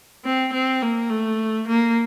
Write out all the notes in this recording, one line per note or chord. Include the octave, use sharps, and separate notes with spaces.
C4
C4
A#3
A3
A#3